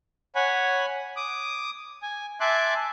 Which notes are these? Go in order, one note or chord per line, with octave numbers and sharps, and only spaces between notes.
C#5 F#5 G#5 B5
D6 D#6
G#5
E5 G#5 A5 C6 D6 F#6